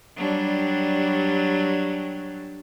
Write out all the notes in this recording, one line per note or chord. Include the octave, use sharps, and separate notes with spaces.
F#3 G3 D4